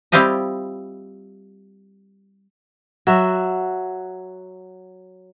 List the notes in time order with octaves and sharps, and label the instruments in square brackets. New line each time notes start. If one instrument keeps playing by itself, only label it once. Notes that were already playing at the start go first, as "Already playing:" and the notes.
[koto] G3 C4 E4 F4 G4 D#5
[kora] F#3 F#4 E5